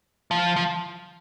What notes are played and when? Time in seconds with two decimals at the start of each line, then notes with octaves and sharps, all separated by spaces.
0.31 F3
0.56 F3